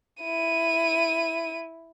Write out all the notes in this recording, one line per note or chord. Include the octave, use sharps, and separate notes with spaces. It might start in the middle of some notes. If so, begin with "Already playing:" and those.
E4 D#7